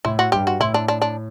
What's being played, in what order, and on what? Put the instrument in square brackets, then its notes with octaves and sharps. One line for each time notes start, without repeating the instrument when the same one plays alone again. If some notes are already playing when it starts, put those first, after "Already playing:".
[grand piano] A2 [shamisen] E4
[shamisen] F#4
[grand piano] G2 [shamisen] G4
[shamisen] F#4
[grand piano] A2 [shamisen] E4
[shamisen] D4
D4
D4